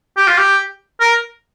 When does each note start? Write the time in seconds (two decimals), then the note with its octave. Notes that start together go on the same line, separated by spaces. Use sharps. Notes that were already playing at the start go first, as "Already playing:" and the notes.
0.17 G4
0.27 F4
0.37 G4
1.00 A#4